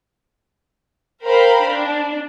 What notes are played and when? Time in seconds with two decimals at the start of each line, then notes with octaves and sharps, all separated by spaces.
1.24 A#4 C5 F5 G5 A#5 B5
1.65 D4